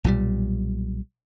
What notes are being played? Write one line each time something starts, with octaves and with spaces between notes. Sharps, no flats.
B1 A#2 C#3 G3